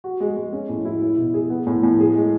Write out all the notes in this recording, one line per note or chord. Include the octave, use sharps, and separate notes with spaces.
F#4
G#3
G#3
C#4
A2
E4
E4
B2
G#4
B3
A2
A2
G#4
G#3